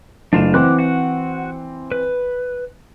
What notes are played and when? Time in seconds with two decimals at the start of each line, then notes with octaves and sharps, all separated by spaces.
0.33 F#1 A3 D4 F4 E7
0.54 E3 C4 F#5 D6 F#6
0.79 F#4 F#5
1.92 B4